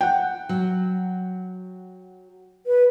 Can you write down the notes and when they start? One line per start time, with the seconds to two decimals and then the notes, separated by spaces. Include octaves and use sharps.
0.01 F#5 G5
0.49 F#3
2.66 B4